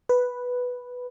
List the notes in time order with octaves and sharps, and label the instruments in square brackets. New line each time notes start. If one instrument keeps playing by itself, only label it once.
[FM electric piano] B4